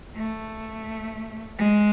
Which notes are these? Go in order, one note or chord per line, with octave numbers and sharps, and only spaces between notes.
A3
G#3